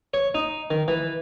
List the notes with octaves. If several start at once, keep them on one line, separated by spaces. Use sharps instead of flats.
C#5
D#4
D#3
E3